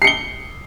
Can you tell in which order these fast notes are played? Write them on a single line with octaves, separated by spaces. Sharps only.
C7 C#7 G7